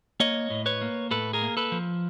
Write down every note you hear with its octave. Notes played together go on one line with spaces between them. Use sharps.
A#3 C#5 D#5
A2
B4 C#5
A#3
A2 A4 B4
G#4 A#4
A#3
A4 B4
F3